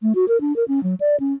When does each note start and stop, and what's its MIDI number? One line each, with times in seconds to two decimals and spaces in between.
0.02 0.13 57
0.15 0.25 66
0.28 0.40 70
0.41 0.55 62
0.56 0.64 70
0.68 0.82 61
0.83 0.95 54
1.00 1.16 74
1.20 1.33 61